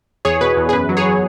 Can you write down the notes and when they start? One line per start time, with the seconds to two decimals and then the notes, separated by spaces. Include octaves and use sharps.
0.25 E2 G#4 C#5
0.41 B2 B4
0.57 E2
0.69 G#4
0.73 F#2 B4
0.89 F#3
0.97 G#4 C#5
1.05 F#3